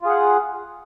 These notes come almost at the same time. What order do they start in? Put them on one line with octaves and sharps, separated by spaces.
F4 G#4 F#5